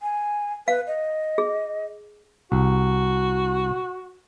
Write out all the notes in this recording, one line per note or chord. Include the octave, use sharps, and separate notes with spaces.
G#5
B4 F5
D#5
G#4
C2 F#4